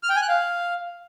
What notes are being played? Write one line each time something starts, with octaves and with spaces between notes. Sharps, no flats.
F6
G5
G#5
F#6
F5